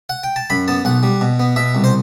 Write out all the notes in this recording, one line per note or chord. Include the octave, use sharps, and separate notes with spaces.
F#5
G5
A5
F#2 B5
B3 A5
B1 F#5
G3
B2
B3
B2 E5
C2
C5